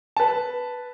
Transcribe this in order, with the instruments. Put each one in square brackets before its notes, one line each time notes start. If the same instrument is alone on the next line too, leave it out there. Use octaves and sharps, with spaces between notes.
[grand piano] B4 A5